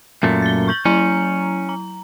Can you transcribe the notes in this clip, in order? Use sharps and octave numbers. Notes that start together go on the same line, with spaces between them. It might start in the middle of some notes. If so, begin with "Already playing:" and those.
F#2 A#2 A3
A6 G7
C#6 G6 F#7
F#3 C#4 E4 A#5
A#5